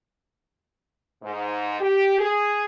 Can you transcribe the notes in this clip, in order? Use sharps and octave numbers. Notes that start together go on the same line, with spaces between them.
G#2
G4
G#4